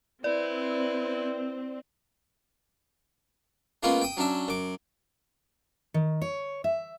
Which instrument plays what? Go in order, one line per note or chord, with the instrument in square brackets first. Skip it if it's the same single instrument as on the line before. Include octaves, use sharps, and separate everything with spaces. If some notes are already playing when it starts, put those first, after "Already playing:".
[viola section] C4 [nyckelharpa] E4 B4 [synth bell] D5
[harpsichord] G#3 A#3 B3 C#4 F4
G5 D#6
F#3 C#4 D4 E5
F#2 D6
[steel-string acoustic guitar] D#3
C#5
E5